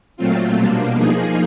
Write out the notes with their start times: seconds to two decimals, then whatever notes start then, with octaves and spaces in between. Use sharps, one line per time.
0.17 A#2 F#3 A3 C4 F4
0.55 B2 G3 A#3 D4
0.94 F3 A#3 D#4 G#4